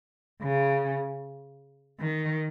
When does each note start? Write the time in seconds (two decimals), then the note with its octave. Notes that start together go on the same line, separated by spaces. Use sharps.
0.42 C#3
2.00 D#3